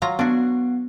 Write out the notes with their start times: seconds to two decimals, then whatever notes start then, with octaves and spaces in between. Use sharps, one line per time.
0.02 F#3 F4 A#5
0.19 B3 D4 F#4 F#5